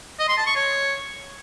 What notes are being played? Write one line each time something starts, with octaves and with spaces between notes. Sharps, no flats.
D#5
C6
A5
C#6
C#5